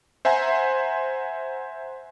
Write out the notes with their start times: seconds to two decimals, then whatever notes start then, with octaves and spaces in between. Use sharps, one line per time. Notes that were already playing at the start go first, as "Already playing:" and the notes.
0.25 C5 E5 F#5 G#5 A#5 C6